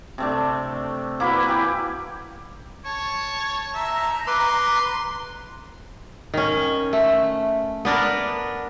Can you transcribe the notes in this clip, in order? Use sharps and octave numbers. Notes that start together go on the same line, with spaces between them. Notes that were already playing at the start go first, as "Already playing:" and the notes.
C3 A3 D4
A#3 E4 F#4 B4
E4 G4 G#5
C#5 A5
E5 A#5
B4 C6 D6
D#3 C#4
A3
B3 D4 A#4